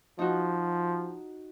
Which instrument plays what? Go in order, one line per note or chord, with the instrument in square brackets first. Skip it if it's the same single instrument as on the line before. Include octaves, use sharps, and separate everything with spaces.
[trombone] F3 [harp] D#4 F#4